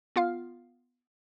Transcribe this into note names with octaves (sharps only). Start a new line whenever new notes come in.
B3 F4 F5 F6